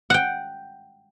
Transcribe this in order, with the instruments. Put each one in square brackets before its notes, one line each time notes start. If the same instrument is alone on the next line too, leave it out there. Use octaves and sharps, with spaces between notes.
[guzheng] F#5 G5